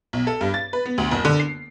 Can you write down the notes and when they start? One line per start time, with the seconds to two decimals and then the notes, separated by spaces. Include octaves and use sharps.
0.13 B1
0.27 A4
0.41 G2
0.54 A6
0.73 B4
0.86 B3
0.98 D2
1.11 F#1
1.25 D3
1.40 C7